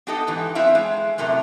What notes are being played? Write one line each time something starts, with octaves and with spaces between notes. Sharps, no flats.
B3 D#4 G4 A4 D#5 F#5
G#2 E3
F#3 B3 C4 E4 E5 F5
G#3
F#2 A2 C3 F#3 A#4